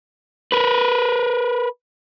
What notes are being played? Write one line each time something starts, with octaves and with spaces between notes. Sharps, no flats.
A#4 B4